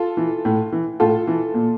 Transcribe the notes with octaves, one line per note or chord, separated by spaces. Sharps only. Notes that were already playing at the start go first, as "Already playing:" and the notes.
Already playing: F4 A4
E3
A2
E3
A2 F4 A4
E3
A#2